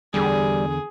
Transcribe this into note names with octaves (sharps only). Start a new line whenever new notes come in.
E2 D3 G3 G#4